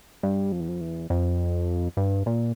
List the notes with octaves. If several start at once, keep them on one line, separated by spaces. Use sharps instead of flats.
G2
F2
E2
F2
E2
F2
G2
A#2